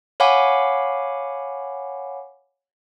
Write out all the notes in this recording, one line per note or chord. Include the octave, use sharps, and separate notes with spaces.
C#5 F5 F#5 G#5 B5 D6